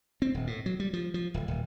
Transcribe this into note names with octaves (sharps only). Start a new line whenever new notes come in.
C4
D#1
A2
F#3
G3
F3
F3
D1
D#1